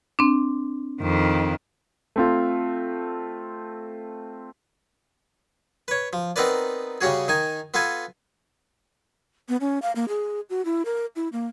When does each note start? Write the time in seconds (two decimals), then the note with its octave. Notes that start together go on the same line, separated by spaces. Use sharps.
0.19 C4 D4
1.02 F2 D#3
2.16 A3 C4 F4
5.88 B4 C#5
6.13 F3
6.36 B3 C4 D#4 A#4 B4 D5
7.01 C#3 G3 C#4 F#4 G#4
7.28 D#3 D#4 G#5
7.74 B3 F4 A4 B4 G#5
9.49 B3
9.61 C#4
9.82 F5
9.96 A#3
10.08 G#4
10.50 F#4
10.65 E4
10.85 A#4
11.16 E4
11.32 A#3